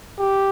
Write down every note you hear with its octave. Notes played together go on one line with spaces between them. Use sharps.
G4